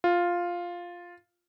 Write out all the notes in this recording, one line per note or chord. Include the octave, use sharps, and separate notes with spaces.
F4